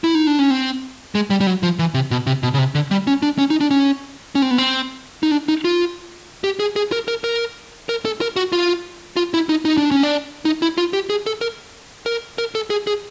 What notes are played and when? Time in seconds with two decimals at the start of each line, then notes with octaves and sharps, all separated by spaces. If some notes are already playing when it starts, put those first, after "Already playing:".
0.04 E4
0.15 D#4
0.27 D4
0.39 C#4
0.50 C4
1.15 G#3
1.30 G3
1.41 G3
1.47 F#3
1.63 F3
1.79 E3
1.94 C3
2.11 B2
2.27 C3
2.43 B2
2.54 C#3
2.58 C3
2.75 D3
2.91 G3
3.07 C#4
3.22 D4
3.38 C#4
3.50 D#4
3.61 D4
3.71 C#4
4.35 C#4
4.42 C4
4.51 B3
4.58 C4
5.23 D#4
5.31 D4
5.48 D#4
5.64 F4
6.44 G4
6.60 G#4
6.76 G#4
6.92 A#4
7.08 A#4
7.24 A#4
7.89 A#4
8.05 A4
8.21 A#4
8.36 F#4
8.52 F4
9.17 F4
9.34 E4
9.49 D#4
9.65 D#4
9.77 D4
9.91 C#4
10.03 D4
10.45 D#4
10.62 E4
10.78 F4
10.93 G4
11.10 G#4
11.26 A4
11.41 A#4
12.06 A#4
12.38 A#4
12.55 A4
12.70 G#4
12.87 G#4